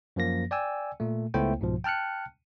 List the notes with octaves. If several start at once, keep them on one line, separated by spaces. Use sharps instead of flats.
F#2 F3 A#3 A#6
D5 G5 G#5 E6
A#2 A3
C#2 A3 B3 E4 C5 G5
C2 G#2 B2 F3
G5 A5 F6 F#6 C#7